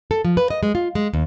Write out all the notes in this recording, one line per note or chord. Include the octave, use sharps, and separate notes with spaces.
A4
F3
B4
D#5
G#3
F4
G#3
D#2